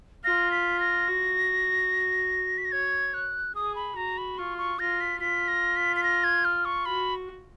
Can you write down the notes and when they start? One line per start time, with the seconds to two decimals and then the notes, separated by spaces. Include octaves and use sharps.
0.24 F4 A#6
0.51 B6
0.80 A#6
1.07 F#4
2.58 B6
2.65 A#6
2.72 C#5 G#6
3.14 F#6
3.55 G#4 D#6
3.76 B5
3.96 F#4 A#5
4.18 B5
4.38 F4 C#6
4.58 C#6
4.79 F4 A#6
5.01 B6
5.21 F4 B6
5.48 A#6
5.76 B6
5.96 B6
6.04 A#6
6.24 G#6
6.45 F6
6.65 C#6
6.86 F#4 B5